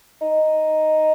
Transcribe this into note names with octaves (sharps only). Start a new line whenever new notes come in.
D#4